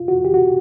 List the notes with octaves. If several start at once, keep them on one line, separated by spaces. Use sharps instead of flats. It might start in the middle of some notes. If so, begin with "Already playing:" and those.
Already playing: F4
F#4
G4
F#4